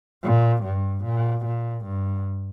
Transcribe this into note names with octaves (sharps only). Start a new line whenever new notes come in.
A#2
G2
A#2
A#2
G2